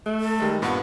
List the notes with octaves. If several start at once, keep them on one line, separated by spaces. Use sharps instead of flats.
A3
A4
D#3 G3 G#3
G2 A#2 B3 F#5